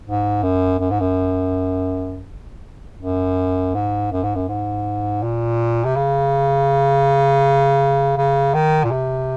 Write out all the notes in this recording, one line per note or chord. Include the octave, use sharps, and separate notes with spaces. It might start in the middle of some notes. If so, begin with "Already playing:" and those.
G#2
F#2
F#2
G#2
F#2
F#2
G#2
F#2
G#2
F#2
G#2
A#2
C3
C#3
C#3
D#3
A#2
C3